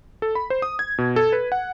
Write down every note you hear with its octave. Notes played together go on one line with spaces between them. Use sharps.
A4
B5
C5
D#6
G#6
B2
A4
B4
F#5